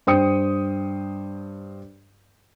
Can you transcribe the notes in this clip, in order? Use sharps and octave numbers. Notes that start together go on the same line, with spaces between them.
G2 C5 G5 D#6 C#7